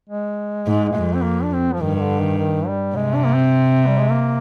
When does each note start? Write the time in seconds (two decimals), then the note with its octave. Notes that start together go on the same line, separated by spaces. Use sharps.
0.10 G#3
0.66 G#2
0.95 F2
1.16 C4
1.24 A#3
1.43 D4
1.53 C4
1.73 F3
1.81 G2 D#3
1.96 D#3
2.01 D3
2.20 D#3
2.38 D#3
2.67 G3
2.96 C3 G#3
3.15 D4
3.26 A#3
3.34 C4
3.87 G3
3.98 G#3
4.11 A#3